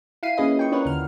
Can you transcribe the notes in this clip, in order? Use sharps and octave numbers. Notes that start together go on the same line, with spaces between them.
E4 F5 C7 D#7
A#3 C#4 G#4 B4 D#5
F4 G5 C#6
C#4 D4 A#4 B4 C#5 F#5
D#2 D3 F6